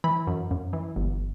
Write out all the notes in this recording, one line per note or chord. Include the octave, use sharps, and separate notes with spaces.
E3 B5
F#2
F#2
E3
G1